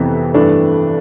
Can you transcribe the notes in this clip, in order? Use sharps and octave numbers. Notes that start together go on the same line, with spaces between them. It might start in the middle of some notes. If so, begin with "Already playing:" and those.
Already playing: F2 C3 E3 B3
G2 E3 A3 D4